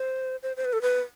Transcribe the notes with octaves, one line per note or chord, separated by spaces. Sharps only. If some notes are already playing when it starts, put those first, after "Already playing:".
Already playing: C5
C5
C5
B4
A4
B4